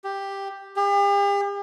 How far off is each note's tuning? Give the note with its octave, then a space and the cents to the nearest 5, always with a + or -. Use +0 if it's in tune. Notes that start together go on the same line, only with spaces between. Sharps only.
G4 +5
G4 +45